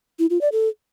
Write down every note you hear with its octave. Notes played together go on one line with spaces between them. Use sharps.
E4
F4
D5
A4